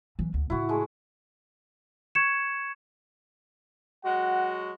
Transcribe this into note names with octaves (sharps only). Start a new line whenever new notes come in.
E3 F#3
D2
A2 C#3 E4 F#4
G#3 A3
C#6 G#6 C#7 E7
F#3 G#3 F#4 F#5